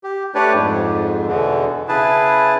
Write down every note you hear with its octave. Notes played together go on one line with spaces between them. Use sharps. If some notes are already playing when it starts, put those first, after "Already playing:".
G4
A3 D4 G4 B4 C#5 D5
F2 G#2
E2 B2 D3 E3
C#3 E4 G#4 B4 A5